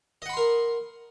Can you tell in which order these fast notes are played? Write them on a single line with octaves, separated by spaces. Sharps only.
D#5 F#5 B5 C6 A#4